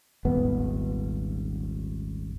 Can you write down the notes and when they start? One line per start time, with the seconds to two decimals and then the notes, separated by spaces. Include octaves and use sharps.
0.25 D#1 G#1 B3